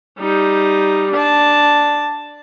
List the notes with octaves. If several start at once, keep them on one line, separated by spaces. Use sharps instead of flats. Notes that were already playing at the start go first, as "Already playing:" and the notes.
G3 D#4
D4 A5